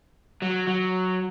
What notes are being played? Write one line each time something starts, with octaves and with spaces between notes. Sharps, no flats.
F#3
F#3